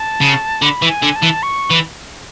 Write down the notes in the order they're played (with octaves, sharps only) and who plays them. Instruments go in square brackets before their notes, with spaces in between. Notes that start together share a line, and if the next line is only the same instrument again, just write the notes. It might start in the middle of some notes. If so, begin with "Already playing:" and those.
Already playing: [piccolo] A5
[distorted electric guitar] C#3
[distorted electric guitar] D3 [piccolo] B5
[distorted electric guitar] E3
[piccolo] G#5
[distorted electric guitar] D3
[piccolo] A5
[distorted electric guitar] E3
[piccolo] C#6
[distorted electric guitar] E3